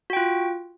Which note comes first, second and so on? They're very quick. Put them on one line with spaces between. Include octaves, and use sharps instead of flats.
F#4 G5 F4